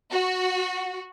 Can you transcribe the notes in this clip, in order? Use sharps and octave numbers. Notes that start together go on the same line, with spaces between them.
F#4